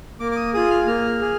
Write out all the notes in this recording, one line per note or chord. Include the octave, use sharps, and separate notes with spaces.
A#3 D6
D6
D#6
F4 G#4 D#6
F6
A#3 F6
G#4